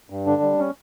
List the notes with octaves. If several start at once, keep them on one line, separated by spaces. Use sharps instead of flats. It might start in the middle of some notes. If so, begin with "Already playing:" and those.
G2
D3 D4
G3
C#4